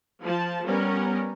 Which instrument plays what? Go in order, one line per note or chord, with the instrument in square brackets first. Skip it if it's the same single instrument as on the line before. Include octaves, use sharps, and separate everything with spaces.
[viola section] F3 A5
[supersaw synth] G3 B3 [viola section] C#4 A#4